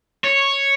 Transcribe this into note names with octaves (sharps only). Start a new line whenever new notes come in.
C#5